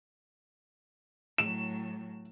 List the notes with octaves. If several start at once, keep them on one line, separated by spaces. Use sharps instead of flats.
A2 F#3 E7